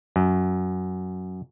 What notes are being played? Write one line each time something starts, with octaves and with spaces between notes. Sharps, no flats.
F#2